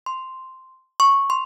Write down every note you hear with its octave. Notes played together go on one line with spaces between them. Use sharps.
C6
C#6
C6